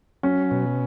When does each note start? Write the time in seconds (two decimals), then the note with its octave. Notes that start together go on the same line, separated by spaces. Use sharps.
0.23 F#3 C#4
0.51 B2